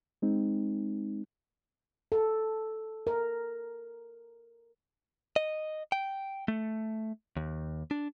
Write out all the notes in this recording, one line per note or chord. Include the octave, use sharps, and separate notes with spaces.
G#3 C4 D#4
A4
A#4
D#5
G5
A3
D#2
D4